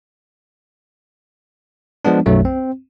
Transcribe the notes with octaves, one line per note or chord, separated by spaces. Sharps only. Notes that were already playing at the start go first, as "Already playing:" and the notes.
F3 G#3 B3 D4
B1 F#2 F#3 A3
C4